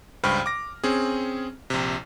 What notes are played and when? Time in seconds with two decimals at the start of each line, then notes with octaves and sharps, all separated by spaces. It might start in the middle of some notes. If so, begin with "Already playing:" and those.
0.24 C#2 G2 C5 G5 B5 F6
0.46 D6 A#6
0.84 C4 C#4 G#4
1.70 A#1 C3